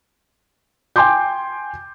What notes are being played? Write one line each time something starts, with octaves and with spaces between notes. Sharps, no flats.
G5 G#5 C6 D6 G6